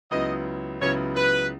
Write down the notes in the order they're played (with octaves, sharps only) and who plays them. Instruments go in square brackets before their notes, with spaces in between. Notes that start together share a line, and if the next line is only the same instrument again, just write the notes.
[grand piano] C#2 C#3 F#3 B3 E4 [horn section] D#5
[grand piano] C#2 C#3 F#3 B3 E4 [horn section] C#5
[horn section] B4